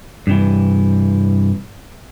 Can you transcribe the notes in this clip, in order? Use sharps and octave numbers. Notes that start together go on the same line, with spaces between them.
G2 C3 E3